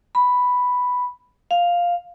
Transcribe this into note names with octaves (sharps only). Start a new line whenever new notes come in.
B5
F5